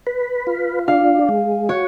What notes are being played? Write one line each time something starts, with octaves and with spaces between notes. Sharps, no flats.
B4
F4
D4 F5
G#3
F#4 C#5